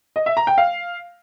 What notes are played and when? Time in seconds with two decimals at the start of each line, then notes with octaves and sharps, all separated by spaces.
0.16 D#5
0.26 E5
0.37 A#5
0.47 G5
0.58 F5